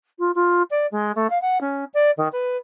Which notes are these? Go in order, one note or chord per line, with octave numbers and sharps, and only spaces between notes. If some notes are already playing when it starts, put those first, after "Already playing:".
F4
F4
D5
G#3
A3
F5
F#5
C#4
D5
D#3
B4